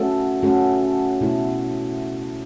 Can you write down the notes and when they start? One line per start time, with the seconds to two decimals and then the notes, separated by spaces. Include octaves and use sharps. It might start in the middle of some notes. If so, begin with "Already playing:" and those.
Already playing: A3 C#4 F#4 A4
0.43 A3 C#4 F#4 A4
1.21 B2 A3 E4 A4